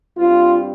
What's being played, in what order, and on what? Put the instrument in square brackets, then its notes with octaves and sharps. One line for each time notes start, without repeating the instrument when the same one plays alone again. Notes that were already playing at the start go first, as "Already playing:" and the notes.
[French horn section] G2 G3 C4 F4